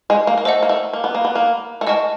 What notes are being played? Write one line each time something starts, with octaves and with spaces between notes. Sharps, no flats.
G#3
A#3
A#3
A3 C5 D#5 F#5
A#3
A3
A#3
B3
A#3
B3
A#3
A3
G#3 D#5 F#5 A5 C#6 F6